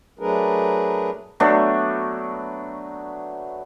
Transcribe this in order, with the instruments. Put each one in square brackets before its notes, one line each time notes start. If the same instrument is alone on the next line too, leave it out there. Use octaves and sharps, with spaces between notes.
[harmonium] F#3 A3 D4 G#4 A#4 B4
[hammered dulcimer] F#3 A3 B3 D4